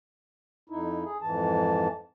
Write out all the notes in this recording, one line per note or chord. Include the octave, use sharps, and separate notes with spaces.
F2 D#4 E4
G#4
F2 G#2 E3 A5